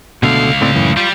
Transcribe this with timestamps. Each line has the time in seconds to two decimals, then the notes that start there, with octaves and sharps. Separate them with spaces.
0.23 C#2 B2 D3 A3 F5
0.61 A2 C4 D5
0.74 F#2 A2 E3
0.97 G3 F4 G4